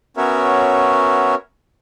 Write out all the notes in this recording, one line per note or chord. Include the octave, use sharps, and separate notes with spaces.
B3 C#4 F#4 A#4 C#5 E5